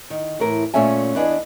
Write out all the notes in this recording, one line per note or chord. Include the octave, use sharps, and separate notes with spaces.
D#3
A2 E3 A#4
A#2 A3 C#4 E5 G#5
E2 B3 D4 D#5 G#5